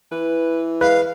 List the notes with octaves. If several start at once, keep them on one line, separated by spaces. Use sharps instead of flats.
E3 B4
G#3 B4 F5